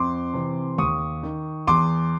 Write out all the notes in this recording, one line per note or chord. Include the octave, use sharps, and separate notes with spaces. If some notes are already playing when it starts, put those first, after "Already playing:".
Already playing: F2 C6 D6
C3 E3
D#2 C#6 D#6
D#3
E2 C6 D6